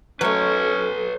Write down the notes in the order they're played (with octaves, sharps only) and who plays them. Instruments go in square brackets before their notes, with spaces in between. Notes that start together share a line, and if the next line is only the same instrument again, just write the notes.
[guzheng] F#3 A3 [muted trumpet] C#4 [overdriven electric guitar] B4 C#5